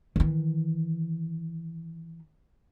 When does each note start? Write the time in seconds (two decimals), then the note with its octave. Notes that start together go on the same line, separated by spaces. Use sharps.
0.16 D#3 E3